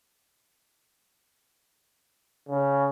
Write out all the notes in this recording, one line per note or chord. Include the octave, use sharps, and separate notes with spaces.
C#3